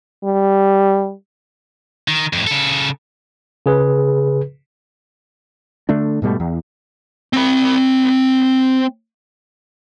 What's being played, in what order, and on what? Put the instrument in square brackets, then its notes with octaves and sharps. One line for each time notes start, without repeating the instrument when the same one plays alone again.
[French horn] G3
[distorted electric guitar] D#3
F2 A2
C#3 A4
[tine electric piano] C#3 G#4 B4
[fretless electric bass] D3 A3 D4
G#2 B2 G3 A3
E2
[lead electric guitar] C4 B5